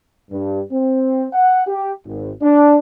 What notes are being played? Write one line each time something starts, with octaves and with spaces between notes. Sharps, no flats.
G2
C4
F#5
G4
G#1
D4